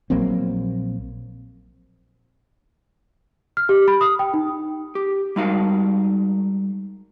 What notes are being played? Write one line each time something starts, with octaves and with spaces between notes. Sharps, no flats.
A#1 F#3 A#3 C4
F6
G4
B5
D#6
G5
D#4
G4
G3 G#3 D#4 F#4 A#4 F5